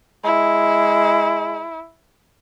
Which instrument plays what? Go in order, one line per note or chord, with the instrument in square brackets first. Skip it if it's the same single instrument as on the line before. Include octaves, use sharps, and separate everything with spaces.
[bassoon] G#3 [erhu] E4